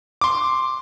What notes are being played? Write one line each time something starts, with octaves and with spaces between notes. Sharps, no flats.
C6 D6